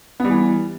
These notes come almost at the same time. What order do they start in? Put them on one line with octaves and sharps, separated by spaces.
B3 G3 E3